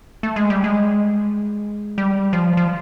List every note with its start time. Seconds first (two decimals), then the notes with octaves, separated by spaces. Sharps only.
0.23 A3
0.36 G#3
0.50 G3
0.64 G#3
1.98 G3
2.33 F3
2.57 F3